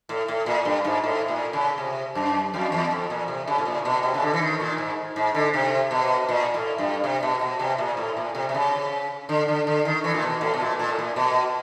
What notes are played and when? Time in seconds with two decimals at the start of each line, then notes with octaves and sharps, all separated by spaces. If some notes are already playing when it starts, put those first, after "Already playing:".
0.09 A2
0.28 A2
0.46 A#2
0.65 G2
0.84 G#2
1.04 A2
1.28 A#2
1.53 C#3
1.78 C3
2.15 F#2
2.54 F2
2.72 E2
2.91 F2
3.10 A#2
3.28 C3
3.47 C#3
3.58 A2
3.66 A#2
3.85 B2
4.03 C3
4.14 C#3
4.22 D3
4.34 E3
4.41 D#3
4.60 A#2
4.78 G#2
5.16 G#2
5.34 D3
5.54 C3
5.91 B2
6.29 A#2
6.54 A2
6.78 G2
7.04 C3
7.23 B2
7.41 B2
7.59 C3
7.78 A#2
7.97 A2
8.17 A#2
8.35 C3
8.49 C3
8.54 C#3
9.29 D3
9.48 D3
9.67 D3
9.85 D#3
10.04 E3
10.14 A#2
10.22 B2
10.41 A2
10.54 B2
10.60 A#2
10.79 A#2
10.88 A2
10.99 A#2
11.16 B2